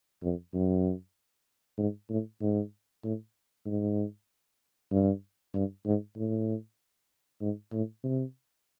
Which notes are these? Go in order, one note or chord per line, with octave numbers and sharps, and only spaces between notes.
F2
F#2
G#2
A2
G#2
A2
G#2
G2
G2
G#2
A2
G#2
A2
C3